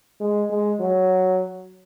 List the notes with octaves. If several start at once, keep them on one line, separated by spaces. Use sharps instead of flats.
G#3
G#3
F#3